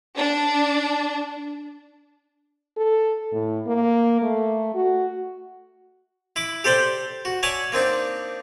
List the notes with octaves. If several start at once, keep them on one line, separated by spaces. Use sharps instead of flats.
D4
A4
A2
A#3
A3
F#4
E4 B5 D6
G4 A4 C5 D5 G5
F#4
C#5 D5 E5 G#5 A5
A#3 C4 D4 D#4